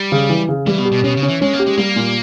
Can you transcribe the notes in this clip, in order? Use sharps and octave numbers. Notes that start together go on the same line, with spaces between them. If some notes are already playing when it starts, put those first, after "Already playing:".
Already playing: G3
C#3
E3
C#3
E3 G3
B2
G4
B2
B2 C#4
C#3
C#4
E3
G#3 C#4
A#3
G4
G#3
G3 A#3
A#2